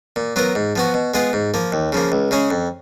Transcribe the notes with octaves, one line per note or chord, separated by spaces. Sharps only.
A#2
F#3 B3 F4 A#4
G#2
F3 B3 F#4
B2
G#3 B3 F4 G#4
G#2
F3 A#3
D#2
C#3 F3 A#3
C#2
C#3 G#3 C#4 G#4
F2